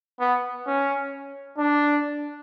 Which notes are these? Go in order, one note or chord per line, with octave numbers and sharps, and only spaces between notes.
B3
C#4
D4